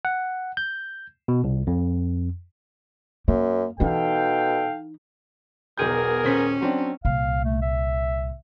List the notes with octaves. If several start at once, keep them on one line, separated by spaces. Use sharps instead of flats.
F#5
G6
B2
C2
F2
F#2 A#3
B2 E3 D#4 A4 F5 G5
E1 B1 B3 G#4 A#4 G6
D#1 C#4 C5 B6
F#3 C4 D4
C2 A#2 F5
A3
E5